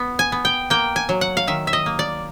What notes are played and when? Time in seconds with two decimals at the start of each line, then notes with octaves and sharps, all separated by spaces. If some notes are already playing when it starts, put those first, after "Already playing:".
Already playing: B3
0.19 G#5
0.32 B3
0.45 G5
0.70 A#3 G5
0.96 G#5
1.09 F#3
1.21 F#5
1.37 F5
1.47 D#3 E5
1.67 E5
1.73 D#5
1.86 A#3
1.99 D5